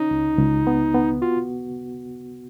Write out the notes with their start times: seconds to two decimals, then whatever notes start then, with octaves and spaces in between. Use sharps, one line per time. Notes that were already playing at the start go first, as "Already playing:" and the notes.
Already playing: C#4 D#4
0.11 C#2
0.38 C#2
0.67 B3
0.94 B3
1.22 F4 F#4